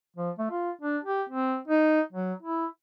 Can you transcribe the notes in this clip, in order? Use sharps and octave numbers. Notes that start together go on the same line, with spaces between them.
F3
A3
F4
D4
G4
C4
D#4
F#3
E4